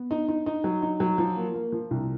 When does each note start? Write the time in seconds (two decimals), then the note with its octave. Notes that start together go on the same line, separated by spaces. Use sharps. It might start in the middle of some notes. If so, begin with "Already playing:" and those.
Already playing: B3
0.11 D#4
0.28 D#4
0.46 D#4
0.64 F#3
0.82 D#4
1.00 F#3
1.18 F3
1.36 A#3
1.54 A#3
1.72 F3
1.91 C2